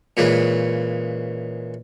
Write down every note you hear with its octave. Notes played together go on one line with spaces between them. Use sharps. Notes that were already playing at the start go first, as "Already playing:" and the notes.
A#2 C#3 E3 G#3